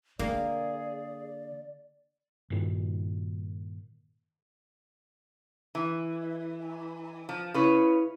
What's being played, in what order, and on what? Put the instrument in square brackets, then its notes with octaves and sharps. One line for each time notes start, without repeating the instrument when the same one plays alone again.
[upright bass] D3 [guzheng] A#3 [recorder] G#4 [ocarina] D5
[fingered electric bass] G2 A#2 D#3
[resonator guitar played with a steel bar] E3
F3
[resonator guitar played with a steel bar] C#3 B4 C#5 [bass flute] E4